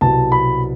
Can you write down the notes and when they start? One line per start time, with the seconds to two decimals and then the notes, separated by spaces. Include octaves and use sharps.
0.01 C2 B2 F#3 B3 A5
0.32 B5